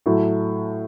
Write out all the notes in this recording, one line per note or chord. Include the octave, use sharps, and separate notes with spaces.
A2 F#3 A3